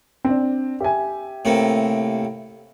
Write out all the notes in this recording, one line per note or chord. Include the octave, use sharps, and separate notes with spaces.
C4 D4
G4 E5 G#5
A2 C3 A#3